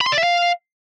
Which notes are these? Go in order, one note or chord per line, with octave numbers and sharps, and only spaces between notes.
B5
C6
D5
E5
F5